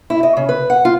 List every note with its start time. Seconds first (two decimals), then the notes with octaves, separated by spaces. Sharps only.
0.10 E4
0.23 D#5
0.37 C#3
0.49 B4
0.70 F#5
0.85 F4